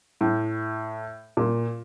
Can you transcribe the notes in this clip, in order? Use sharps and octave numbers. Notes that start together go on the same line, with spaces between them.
A2
A#2